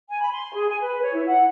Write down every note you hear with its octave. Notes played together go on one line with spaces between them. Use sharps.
G#5
B5
C6
G#4
G#5
B4
C#5
E4
F#5